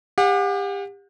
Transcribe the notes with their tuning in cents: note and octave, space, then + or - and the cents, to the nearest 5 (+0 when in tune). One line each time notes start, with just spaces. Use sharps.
G4 +30 F#5 -35